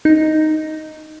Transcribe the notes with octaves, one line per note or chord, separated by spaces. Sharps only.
D#4